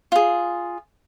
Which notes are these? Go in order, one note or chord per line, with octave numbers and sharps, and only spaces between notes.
F4 G#4